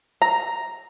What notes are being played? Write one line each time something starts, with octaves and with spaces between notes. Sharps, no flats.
A#5